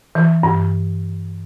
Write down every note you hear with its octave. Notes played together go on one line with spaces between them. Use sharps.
E3
G2